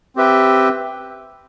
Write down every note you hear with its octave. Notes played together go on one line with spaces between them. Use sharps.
C4 G4 B4 E5 G5